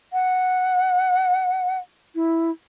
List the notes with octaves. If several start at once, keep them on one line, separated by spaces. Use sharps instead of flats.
F#5
E4